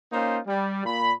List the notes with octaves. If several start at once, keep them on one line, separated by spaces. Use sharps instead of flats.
A#3 C#4 D#4 F4 C5
G3
A#2 B5